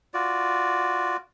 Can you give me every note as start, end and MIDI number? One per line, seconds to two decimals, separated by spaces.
0.14 1.17 65
0.14 1.17 66
0.14 1.17 74